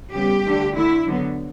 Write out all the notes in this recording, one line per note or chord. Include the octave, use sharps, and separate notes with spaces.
C#3 G3 B3 G4
D3 A3
D3 A3 E4
D3 F#3 B3